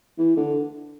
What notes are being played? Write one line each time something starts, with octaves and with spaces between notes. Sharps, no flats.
E3
D3